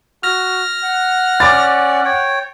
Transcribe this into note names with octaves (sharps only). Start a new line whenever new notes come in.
F#4 F6 A#6
F#5
C#4 D5 D6 A6
C#5 G5